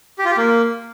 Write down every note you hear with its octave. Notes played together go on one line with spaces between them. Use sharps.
G4
F4
G4
A#3